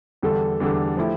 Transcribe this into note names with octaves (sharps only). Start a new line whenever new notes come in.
E2 D3 G3 D4 A4
E2 D3 G3 D4 A4
F3 A3 E4 G4